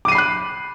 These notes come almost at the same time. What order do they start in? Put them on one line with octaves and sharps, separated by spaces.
D6 D#7 C7 B5 F#6